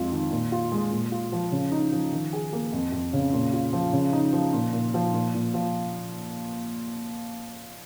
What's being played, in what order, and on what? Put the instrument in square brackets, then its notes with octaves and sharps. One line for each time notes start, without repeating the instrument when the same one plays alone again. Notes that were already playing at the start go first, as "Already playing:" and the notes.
Already playing: [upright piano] F2 G#3 F4
D#3
A#2
F4
G#3
A#2
F4
F3
C#3
D#4
F3
D#3
G#4
A#3
F2
F2
C#3
A#2
F4
F3
C#3
D#4
F3
A#2
A#2
F3
A#2
A#2
F3